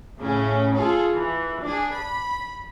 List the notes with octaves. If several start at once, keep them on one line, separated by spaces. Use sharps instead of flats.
A2 C#3 C#4
F4 G#4 A4
E3
D4 G#4
B5